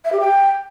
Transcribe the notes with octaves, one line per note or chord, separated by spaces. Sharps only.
E5
G4
G5